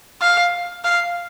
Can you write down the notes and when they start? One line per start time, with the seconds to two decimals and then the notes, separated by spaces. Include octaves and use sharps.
0.21 F5
0.84 F5